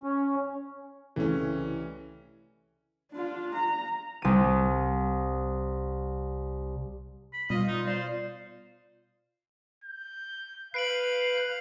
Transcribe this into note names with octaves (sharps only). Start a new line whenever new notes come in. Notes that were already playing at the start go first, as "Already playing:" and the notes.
C#4
C2 C#3 E3 A3 C#4
D4 F4
A#5
C2 D#7
B5
B2 G3 F4 D#5
D#4
C5 D5
G6
B4 F5 G6 C7 D7 F#7